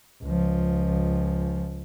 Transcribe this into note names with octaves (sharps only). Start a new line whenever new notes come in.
C#2 F3